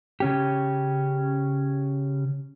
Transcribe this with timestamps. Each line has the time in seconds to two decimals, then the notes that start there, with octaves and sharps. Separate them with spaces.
0.20 C#3 C#4 G4